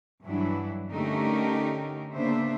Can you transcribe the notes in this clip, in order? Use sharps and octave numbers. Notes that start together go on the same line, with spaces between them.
G2 E3 F#3 D4 E4
D3 A3 C#4 D#4 G4 A#4
C#3 A#3 B3 D4 C5 E5